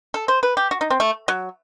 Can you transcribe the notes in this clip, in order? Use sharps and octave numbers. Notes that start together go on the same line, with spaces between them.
A4
C5
B4
G4
F#4
D#4
C4
A3
F#3